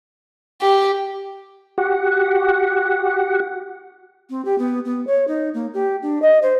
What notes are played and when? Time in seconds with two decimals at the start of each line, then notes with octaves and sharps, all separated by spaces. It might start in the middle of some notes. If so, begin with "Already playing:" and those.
0.62 G4
1.78 F#4 G4 F#5
4.30 C4
4.45 G4
4.58 B3
4.85 B3
5.07 C#5
5.28 D#4
5.54 A#3
5.74 G4
6.02 D4
6.22 D#5
6.42 C5